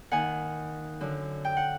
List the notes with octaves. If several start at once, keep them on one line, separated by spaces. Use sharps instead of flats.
D#2 D#3 F#5 G#5
F#2 D3
G5
F#5